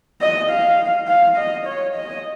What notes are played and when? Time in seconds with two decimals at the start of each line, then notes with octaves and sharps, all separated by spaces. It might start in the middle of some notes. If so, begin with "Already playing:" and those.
0.21 D#5
0.50 F5
1.08 F5
1.37 D#5
1.67 C#5
1.95 D#5